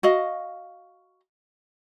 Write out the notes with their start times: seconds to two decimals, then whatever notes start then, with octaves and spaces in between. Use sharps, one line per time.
0.03 F#4 D#5 F5